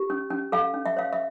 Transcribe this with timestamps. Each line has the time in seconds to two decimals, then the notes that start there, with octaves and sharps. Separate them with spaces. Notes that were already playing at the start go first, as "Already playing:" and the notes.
Already playing: G4
0.10 C#4
0.30 C#4
0.52 A4 F5
0.74 C#4
0.85 E5
0.97 C#5 F5
1.13 E5